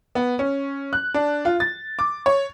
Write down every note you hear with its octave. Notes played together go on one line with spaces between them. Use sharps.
B3
C#4
F#6
D4
F4
A6
D6
C#5